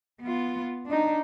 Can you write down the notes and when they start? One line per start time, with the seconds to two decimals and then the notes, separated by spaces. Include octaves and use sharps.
0.21 B3 F4
0.87 D4 D#4